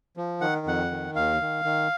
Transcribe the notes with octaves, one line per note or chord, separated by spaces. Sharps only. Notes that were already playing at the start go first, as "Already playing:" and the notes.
F3
D#3 F#5
F2 F#5
D#3
D#2 F5
D#3
D#3